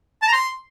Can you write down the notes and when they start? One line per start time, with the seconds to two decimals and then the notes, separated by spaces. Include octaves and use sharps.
0.22 A5
0.28 A#5
0.33 C6